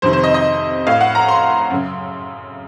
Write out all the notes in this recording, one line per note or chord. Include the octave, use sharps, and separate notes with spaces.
F2 C3 D#3 C5
C5
D#5
D#5
A2 F5
F#5
A#5
C6
F#2 C#3